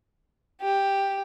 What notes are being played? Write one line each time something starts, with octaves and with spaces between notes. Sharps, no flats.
G4